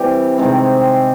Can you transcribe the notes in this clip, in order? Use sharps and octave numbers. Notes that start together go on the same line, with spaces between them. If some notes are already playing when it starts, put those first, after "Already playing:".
Already playing: E3 G3 C4 G4
C3 D#3 G#3 C4